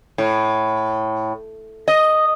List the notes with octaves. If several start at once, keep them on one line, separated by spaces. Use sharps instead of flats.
A2
D#5